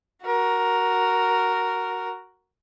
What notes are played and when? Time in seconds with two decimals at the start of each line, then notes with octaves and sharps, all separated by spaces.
0.24 F#4 A#4